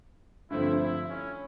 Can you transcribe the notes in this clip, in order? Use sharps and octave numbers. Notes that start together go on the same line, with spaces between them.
G2 D3 F3 A3 C4 E4
E4
C#4